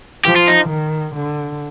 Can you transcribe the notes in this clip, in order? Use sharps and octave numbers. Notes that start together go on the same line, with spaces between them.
F3 G4
F4
D#4
D#3
D3